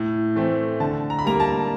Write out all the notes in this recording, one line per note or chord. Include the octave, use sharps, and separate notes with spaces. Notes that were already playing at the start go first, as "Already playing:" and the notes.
Already playing: A2
E3 A3 C4
D3 A5
A#5
B5
G3 A#3 A#5
A5